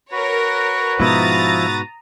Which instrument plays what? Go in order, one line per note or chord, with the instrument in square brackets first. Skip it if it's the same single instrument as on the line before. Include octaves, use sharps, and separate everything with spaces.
[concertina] F#4 B4 [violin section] A#4 C#5
[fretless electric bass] G#2 B2 [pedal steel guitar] F3 E4 [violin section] A#5 D#6 A6